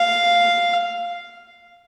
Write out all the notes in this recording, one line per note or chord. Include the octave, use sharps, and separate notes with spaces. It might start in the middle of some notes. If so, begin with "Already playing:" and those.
Already playing: F5